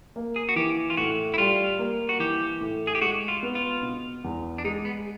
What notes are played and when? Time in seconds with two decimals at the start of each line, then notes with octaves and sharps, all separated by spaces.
0.16 A#3
0.36 G#4
0.49 F#4
0.56 E3 G4
0.90 F4
0.97 A2 F#4
1.34 E4
1.38 G3 F4
1.79 A#3
2.09 F#4
2.19 E3 G4
2.61 A2
2.87 G#4
2.95 G4
3.02 G#3 F#4
3.28 F4
3.43 B3
3.55 F4
3.83 B2
4.24 E2
4.58 D4
4.64 G#3 D#4
4.85 B3